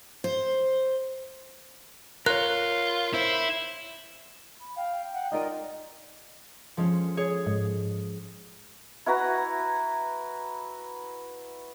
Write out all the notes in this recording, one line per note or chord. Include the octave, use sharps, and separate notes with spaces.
C5
F4 A#4 C#5 F#6
E4 C5
B5
F5 G5
F#5
D#4 F4 A#4 D5 D#5
F3 G#3 C#4
G#4 C#5
G#2 G#3
E4 F#4 B4 A#5